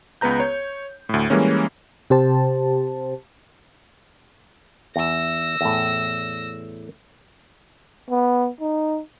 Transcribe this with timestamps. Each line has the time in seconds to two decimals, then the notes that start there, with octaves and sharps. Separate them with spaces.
0.21 C#2 B3 B4 A#5 G6
0.40 C#5
1.09 D2 A2
1.30 E3 G3 G#3 A#3 C#4
2.10 C3 G4 C5 A5
4.96 E2 E6 A#6
5.61 E2 A2
8.10 B3
8.61 D#4